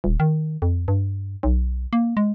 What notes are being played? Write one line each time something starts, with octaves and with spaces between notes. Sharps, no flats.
D#1
D#3
F2
G2
B1
A#3
G#3